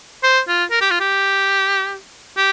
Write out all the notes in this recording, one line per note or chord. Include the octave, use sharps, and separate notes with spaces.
C5
F4
A#4
G4
F4
G4
G4